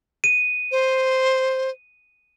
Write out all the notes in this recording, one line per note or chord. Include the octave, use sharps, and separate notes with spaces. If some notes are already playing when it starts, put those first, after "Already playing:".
D#7
C5